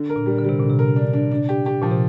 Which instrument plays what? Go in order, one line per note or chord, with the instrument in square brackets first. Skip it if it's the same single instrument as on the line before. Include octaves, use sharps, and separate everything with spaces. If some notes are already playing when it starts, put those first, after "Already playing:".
Already playing: [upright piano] D3
A#4
[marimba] A#2
[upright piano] G3
[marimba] D3
[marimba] C3 [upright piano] G3
[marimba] A#2 [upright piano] D3
[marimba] C3
[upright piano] A#4
D4
D4
D4
G4
G4
[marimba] A#2 [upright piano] F3
[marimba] C3